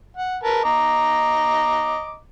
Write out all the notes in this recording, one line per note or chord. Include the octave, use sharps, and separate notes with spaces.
F#5
A#4 B4 A5
D#5 A#5 D6